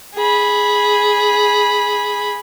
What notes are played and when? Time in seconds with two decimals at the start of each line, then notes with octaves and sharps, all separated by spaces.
0.15 G#4 B5